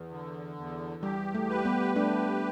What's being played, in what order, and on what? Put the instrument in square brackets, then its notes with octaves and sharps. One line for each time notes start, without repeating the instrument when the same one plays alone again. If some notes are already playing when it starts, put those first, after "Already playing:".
Already playing: [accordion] E2 [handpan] E3
[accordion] D3
E2
[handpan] G3 [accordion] G4
[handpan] A3
[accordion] B4
[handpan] G3 B3
[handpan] A3 D4 [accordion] G4